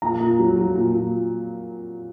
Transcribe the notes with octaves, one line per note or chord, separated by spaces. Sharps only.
A#2 A#5
A#2
F#3
F#3
A#2
A#2